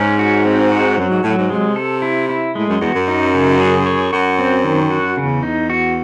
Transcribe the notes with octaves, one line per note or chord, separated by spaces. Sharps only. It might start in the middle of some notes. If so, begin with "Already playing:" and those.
Already playing: G#2 C#4
F#4
C4
F#4
F#2 F#3
G#2
A2 F#3
G#2
C3 G#3
A4
E4
E4
A2 G#3
F#2
E2 F#4
F#2
D#4
C#3
G#4
C#5
F#2 F#4
C4
D#3
F#4
E2 C#3
D#4
F#4